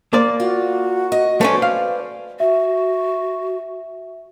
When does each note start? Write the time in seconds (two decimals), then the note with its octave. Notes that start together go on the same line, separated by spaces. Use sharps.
0.13 A#3 C5 D5
0.40 F4 F#4
1.12 D#5
1.41 A3 C#4 B4 C5 D5
1.62 F5
2.40 F#4 E5